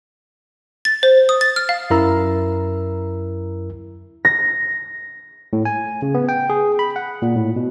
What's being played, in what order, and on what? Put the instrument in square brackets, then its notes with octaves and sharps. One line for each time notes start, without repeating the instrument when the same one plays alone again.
[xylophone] A6
C5
D#6
A6
F6
F5
[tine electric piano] F#2 E4 A#4 A#5 E6
[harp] A#6
[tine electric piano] A2
G#5
C#3
B3
G5
G#4
B5
F#5
A#2
A2
B2